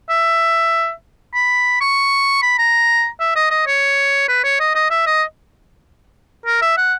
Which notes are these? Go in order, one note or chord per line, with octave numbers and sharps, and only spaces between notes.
E5
B5
C#6
B5
A#5
E5
D#5
D#5
C#5
B4
C#5
D#5
D#5
E5
D#5
A#4
E5
F#5